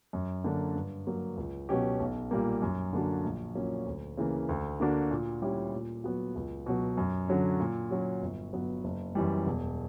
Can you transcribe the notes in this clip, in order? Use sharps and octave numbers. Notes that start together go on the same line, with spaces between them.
F#2
D3 A#3 D4
G2
F#3 A#3
C#2
B2 F#3 C#4 G4
B1
A#2 G3 A#3
F#2
D3 A#3 D4 F#4
A#1
A#2 F#3 A#3 C#4
D2
C#3 E3 A#3
D2
D3 A#3 D4 F#4
A#2
G3 C#4 E4 G4
A#2
F#3 B3 F#4
C#2
B2 F#3
F#2
D3 F#3 C#4
A#2
F#3 C#4 F#4
G1
G2 F#3 B3
F#1
F#2 E3 G3
E1